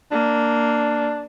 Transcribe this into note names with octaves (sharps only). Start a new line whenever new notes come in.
A#3 D4